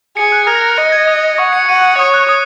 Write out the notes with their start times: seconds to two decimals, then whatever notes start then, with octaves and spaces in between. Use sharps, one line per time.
0.17 G#4 C#7
0.32 F#6
0.47 A#4 G#6
0.55 A#6
0.62 C#7
0.77 D#5 C#7
0.92 G#6
1.07 D#6
1.38 F#5 C#6
1.53 C#7
1.68 F#5 D#7
1.98 C#5 D#6
2.14 F#6
2.29 D#6